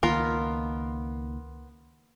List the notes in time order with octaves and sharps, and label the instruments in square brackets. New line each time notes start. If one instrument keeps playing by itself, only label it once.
[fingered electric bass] C#2 D#3 A#3 [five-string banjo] B3 F4 A#4